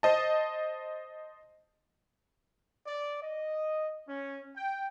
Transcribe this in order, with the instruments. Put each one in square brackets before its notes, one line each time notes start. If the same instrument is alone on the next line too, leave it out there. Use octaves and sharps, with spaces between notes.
[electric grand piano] C5 D#5 A5
[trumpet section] D5
D#5
C#4
G5